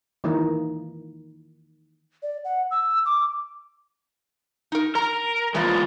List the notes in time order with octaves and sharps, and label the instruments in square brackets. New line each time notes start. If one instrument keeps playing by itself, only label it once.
[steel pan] D#3 E3 A#3 D#4
[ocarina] D5
F#5
E6
D6
[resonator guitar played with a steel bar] D#4 A#4
[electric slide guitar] A#4 [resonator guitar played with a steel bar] A#5
[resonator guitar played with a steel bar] E3 F3 A#3 [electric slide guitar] G#3 B3 F4